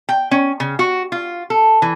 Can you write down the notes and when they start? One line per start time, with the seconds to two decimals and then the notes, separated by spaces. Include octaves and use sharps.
0.09 G5
0.31 C#4
0.60 C#3
0.79 F#4
1.12 F4
1.50 A4
1.82 E3